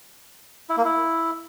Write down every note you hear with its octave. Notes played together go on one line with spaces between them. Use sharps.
E4
A#3
E4